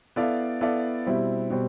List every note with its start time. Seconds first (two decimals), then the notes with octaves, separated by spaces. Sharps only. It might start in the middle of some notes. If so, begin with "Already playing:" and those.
0.16 B3 E4 A4 D5 F5
0.61 B3 E4 A4 D5 F5
1.06 B2 G3 C4 E4
1.50 B2 G3 C4